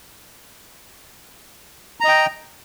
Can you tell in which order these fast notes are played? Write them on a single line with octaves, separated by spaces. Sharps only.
A#5 D#5 G5